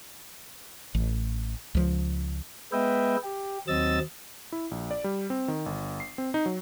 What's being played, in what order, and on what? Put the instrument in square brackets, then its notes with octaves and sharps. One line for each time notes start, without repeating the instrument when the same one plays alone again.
[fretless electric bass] A1
C#2 F3
[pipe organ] G#3 B3 B4 D#5 E5 G5
G4
D#2 F#3 C4 D#5 E6 A6
[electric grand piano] E4
A#1
D5
G3
C4
D#3
G1
C7
C4
D#4
F#3